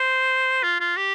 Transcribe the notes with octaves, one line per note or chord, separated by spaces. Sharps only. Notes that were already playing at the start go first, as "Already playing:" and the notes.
Already playing: C5
F4
F4
G4